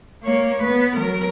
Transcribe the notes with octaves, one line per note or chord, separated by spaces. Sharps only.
A#3 C#5
B3 B4
F#3 A#4